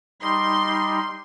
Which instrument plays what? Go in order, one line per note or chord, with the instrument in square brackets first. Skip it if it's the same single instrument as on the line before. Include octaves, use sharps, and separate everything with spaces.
[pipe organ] G3 D#4 [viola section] C6